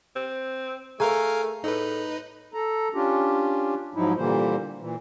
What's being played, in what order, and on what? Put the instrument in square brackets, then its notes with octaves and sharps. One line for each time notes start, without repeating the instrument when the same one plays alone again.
[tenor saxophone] C4
[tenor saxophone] A3 [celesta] G#4 A#5 [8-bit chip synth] A#4 F5 G#5
[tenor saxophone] A2 [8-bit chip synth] D#4 B4
[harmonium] A4 A#5
C#4 D4 F4 G4
G#2 F3 F#3 D#4 E4
A#2 D3 E3 G3 A#3 C5
A#2 E3